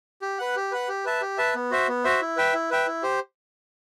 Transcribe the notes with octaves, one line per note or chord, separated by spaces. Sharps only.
G4
B4 F#5
G4
B4 F#5
G4
B4 E5 A5
G4
B4 E5 A5
B3
F#4 C5 E5
B3
F#4 C5 E5
E4
B4 E5 G5
E4
B4 E5 G5
E4
G4 C5